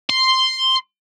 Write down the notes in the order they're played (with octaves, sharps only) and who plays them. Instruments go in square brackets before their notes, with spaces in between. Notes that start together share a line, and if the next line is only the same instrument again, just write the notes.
[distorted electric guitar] C6